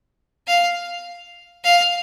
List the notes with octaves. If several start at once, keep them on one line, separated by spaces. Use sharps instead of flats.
F5
F5